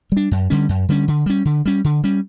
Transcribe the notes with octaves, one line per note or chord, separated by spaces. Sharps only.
G3 D4
F#2
D3 G3 C#4
F#2
D3 G3 C#4
D3
G3 C#4
D3
G3 C#4
D3
G3 C#4